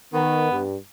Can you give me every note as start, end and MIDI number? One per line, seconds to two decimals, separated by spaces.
0.14 0.47 51
0.14 0.61 59
0.51 0.76 43